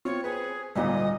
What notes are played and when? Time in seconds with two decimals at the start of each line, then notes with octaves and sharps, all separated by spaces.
0.05 C4 F4 C#5
0.24 G#4 B4
0.75 G#1 D2 A#2 G3 D#5